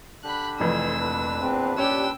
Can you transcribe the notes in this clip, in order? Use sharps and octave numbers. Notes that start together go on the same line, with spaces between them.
D3 D4 G4 B5 F#6
F1 F2 E3 G#4 C5 G#5 E6
A#2 D4 B4
E2 C4
C#4 G4 D5 G5 E6